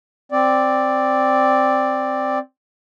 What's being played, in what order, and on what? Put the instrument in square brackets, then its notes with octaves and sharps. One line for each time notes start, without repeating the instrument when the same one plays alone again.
[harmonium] C4 D5